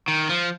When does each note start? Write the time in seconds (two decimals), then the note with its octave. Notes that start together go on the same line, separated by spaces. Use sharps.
0.08 D#3
0.29 F3